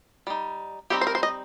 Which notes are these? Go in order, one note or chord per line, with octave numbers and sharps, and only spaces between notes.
G3 D#4
G3 C4 D#4 G4
C5
A#4
C5
D#5